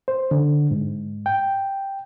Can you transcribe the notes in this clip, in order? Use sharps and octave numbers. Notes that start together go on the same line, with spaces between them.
C5
D3
G#2
G5